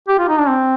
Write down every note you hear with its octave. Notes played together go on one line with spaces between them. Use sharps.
G4
F4
D#4
D4
C4